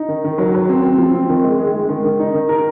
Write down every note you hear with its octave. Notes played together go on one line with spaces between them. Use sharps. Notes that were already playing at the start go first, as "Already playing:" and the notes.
Already playing: D#4
D#3
D#3
F#3
F#3
C4
C4
F3
C4
D#3
G#3
G#3
G#3
D#3
D#3
D#4
D#3
A#4